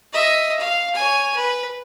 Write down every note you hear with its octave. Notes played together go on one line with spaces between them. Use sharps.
D#5 E5
F5
C#5 G#5
B4